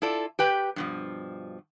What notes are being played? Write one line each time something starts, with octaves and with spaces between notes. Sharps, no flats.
E4 F4 A4 D5
G4 B4 G5
G2 B2 F3